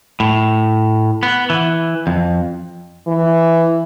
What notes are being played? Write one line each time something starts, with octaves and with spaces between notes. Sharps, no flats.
A2
B3
E3
F2
E3